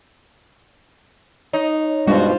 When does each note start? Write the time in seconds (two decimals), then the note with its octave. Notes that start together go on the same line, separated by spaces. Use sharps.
1.53 D#4 C#5
2.07 G2 B2 G3 G#3 D4 F4 F#4 C5